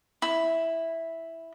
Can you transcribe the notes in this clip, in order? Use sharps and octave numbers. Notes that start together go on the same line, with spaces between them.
E4